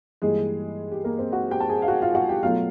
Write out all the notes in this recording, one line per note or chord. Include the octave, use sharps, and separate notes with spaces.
G2 E3 G3 G#3 A#3 G#4
G4
A#3 A#4
C4 C5
F#4 F#5
G4 G5
A5
G#4 G#5
F5
F#4 F#5
F4 F5
F#4 F#5
G4 G5
B2 F#3 A3 F4 F5